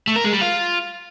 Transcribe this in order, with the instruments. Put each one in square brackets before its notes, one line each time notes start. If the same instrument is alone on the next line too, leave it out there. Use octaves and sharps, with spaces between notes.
[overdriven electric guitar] A3
A#4
G#3
G3
F4